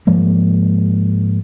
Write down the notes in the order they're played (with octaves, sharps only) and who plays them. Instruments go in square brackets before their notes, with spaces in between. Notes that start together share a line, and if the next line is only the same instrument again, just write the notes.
[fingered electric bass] G#2 F3 G#3 A#3